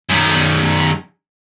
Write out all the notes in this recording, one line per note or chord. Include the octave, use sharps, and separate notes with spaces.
F#2 D#3